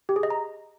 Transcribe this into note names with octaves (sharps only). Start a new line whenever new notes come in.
G4
G#4
D#5
A#5